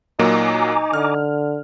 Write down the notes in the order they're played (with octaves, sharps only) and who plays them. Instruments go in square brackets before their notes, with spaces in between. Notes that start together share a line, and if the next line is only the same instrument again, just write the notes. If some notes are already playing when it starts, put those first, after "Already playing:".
[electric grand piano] A#2 F#3 A#3 [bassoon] D#4 [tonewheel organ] G#5 A#5 D6
[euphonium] D3 [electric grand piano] F6